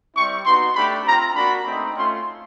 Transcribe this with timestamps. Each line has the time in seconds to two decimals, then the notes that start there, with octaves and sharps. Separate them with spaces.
0.15 G3 C4 E4 C#6
0.44 B3 D#4 F#4 C6
0.75 A3 D4 G4 B5
1.05 C4 F4 A#5
1.35 A#3 D4 F#4 B5
1.65 A3 C4 D#4
1.95 A3 C#4 F4 C6